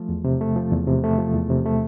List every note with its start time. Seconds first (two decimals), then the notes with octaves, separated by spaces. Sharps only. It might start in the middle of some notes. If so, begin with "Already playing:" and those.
Already playing: F3 A3
0.09 E2
0.24 C3
0.41 A3
0.56 F3
0.72 E2
0.87 C3
1.04 A3
1.19 F3
1.34 E2
1.50 C3
1.66 A3